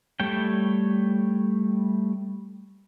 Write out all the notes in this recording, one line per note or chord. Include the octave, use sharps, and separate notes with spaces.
G3 A3 C#5 G5